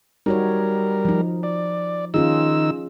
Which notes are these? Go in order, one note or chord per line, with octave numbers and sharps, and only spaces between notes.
G3 D#4 F#4 A#4 C#5
F3 D#4
D5
D#3 C#4 D#4 F4 G#4 E6